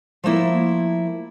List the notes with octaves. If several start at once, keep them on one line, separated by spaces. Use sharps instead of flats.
F3 A3 A#3 E4